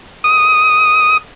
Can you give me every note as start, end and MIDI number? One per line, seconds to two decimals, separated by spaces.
0.24 1.17 87